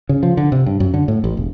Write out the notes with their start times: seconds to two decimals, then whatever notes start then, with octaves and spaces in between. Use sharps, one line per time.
0.09 C#3
0.23 F3
0.37 D3
0.52 C3
0.66 G2
0.80 F#2
0.94 D3
1.08 A2
1.24 A1
1.37 E1